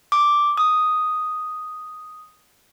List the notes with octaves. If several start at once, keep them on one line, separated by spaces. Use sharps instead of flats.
D6
D#6